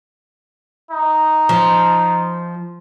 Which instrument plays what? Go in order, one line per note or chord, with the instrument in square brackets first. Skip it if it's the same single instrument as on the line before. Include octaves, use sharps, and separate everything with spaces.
[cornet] D#4
[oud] F3